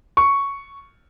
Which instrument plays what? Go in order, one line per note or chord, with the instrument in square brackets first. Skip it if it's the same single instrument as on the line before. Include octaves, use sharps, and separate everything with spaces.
[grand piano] C#6